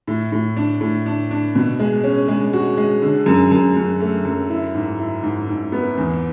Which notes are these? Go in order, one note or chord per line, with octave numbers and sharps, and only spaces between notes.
A2
A2
D4
A2
D4
D4
B2
G#3
C#4
G#3
F#4
G#3
D3
F#2
F#2
F#2
A3
F#2
E4
G#2
E4
G#2
G#2
B3
E2